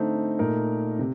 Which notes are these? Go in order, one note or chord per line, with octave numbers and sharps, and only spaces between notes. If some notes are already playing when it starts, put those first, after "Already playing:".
Already playing: D3 A3 C4 D#4
A#2 A3 D#4 A#4
C3